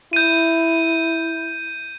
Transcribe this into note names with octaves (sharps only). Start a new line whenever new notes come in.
E4 G6 D#7